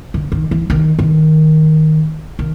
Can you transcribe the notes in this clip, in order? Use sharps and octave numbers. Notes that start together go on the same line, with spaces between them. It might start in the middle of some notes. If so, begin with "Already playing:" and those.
D3
D#3
E3
D#3
D#3
D#3